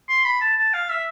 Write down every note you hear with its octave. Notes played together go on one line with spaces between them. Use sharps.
C6
B5
A5
A5
F5
E5